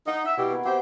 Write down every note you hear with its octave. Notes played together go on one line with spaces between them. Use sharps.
D#4 F#5
E5
B2 E4 G4
B3 A#4 G#5
C4 F#4 G4 C5 E5 G5